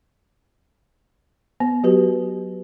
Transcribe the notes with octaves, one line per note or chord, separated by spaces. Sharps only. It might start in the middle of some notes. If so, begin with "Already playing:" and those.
B3
F#3 F#4 G4 B4